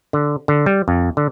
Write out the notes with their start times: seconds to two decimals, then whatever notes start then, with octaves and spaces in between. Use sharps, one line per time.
0.13 D3
0.48 D3
0.66 G3
0.88 F2
1.17 D3